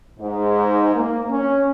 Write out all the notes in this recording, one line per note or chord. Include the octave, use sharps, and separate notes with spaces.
G#2
A#3
C#4